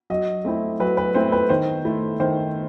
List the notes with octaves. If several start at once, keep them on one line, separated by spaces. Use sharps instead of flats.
F#3 D#5
A3 C4 E4
F#3 B4
B4
A3 C4 E4 C5
B4
D#3 C5
A3 E4
D#3 C5